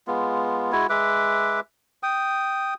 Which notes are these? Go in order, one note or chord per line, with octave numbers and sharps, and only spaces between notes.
G#3 B3 F4
G#3 E4 F#4 G#5
G#3 B4 E5 D6
G5 D#6